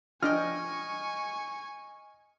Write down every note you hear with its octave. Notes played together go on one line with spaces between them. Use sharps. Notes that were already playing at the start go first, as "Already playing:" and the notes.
F3 D4 D#5 G5 G#5 C#6 F6